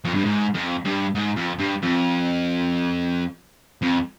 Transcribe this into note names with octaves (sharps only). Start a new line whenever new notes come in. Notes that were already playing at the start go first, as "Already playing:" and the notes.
F2
G2
G#2
F2
G2
G#2
F2
G2
F2
F2